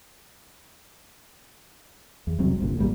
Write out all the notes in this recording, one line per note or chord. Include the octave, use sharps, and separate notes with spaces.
E2
E1 C2 F#3 C4
G1 C2 G2 A#2
G#1 F#2 G3 A#3